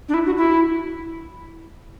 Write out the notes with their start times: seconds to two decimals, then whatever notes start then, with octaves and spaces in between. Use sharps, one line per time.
0.09 D4
0.14 E4
0.26 F#4
0.38 E4